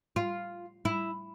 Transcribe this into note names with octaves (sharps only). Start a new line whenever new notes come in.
F4
E4